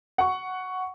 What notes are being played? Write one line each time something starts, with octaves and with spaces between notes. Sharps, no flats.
F#5 C#6